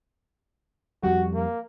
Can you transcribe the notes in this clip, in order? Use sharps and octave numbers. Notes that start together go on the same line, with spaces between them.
F2 G3 F#4
A#3